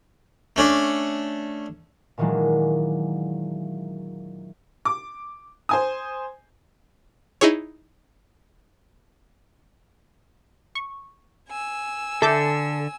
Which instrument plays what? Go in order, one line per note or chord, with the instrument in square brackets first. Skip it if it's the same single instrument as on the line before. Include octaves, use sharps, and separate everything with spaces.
[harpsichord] A3 C#4 D4
[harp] A#2 D#3 E3 F#3 G#3 D4
[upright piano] D6
C5 G#5 D#6
[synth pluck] D#4 E4 G#4 C#5
[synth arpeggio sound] C#6
[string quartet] G#5 E6
[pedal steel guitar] D3 [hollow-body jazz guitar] A4 [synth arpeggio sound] E5 D6 G6